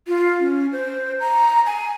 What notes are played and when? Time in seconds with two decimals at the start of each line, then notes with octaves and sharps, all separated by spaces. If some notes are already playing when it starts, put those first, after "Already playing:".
0.07 F4
0.40 C#4
0.72 C5
1.20 A#5
1.66 G#5